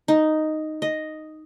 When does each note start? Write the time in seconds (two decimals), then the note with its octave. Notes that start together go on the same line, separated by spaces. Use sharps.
0.08 D#4
0.82 D#5